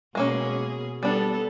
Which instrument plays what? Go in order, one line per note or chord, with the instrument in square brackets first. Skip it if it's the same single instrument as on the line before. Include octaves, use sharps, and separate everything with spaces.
[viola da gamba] B2 G#4 [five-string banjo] G#3 A#3 C#4
[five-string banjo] G3 D4 [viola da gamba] B3 A4